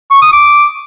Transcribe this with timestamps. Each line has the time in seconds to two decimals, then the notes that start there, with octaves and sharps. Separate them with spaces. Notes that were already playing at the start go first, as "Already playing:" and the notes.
0.11 C#6
0.22 D#6
0.33 D6